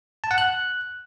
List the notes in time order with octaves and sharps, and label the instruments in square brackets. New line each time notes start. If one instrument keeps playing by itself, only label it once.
[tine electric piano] A5
F#5
F#6